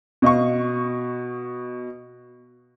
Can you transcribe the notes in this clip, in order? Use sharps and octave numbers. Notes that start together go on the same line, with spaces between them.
B2 D#5 F5 C#6